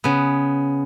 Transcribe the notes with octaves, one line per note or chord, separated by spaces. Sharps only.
C#3 B3